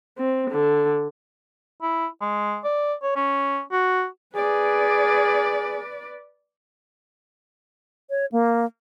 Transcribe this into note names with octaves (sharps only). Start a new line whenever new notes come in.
C4
D3
E4
G#3
D5
C#5
C#4
F#4
G#4 B4 D5
C#5
A#3